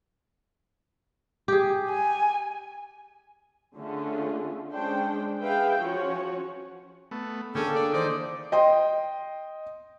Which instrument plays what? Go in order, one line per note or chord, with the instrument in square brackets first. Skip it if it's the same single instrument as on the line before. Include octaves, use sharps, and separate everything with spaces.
[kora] G4 G#4
[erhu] G#5
[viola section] D3 A3 C#4 F4 G#4
G#3 C#4 D4 C5 G5
G#4 B4 E5 F5 G5
F3 C#4 F#4 C#5
[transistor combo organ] A3 B3
[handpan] D3 A#3 G#4 [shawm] C#4 [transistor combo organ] D4 G5 E6 [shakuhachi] A4
[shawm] D5
[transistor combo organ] D#3 E3 D#4 [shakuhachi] C5 [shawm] D5
[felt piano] D#5 G5 C6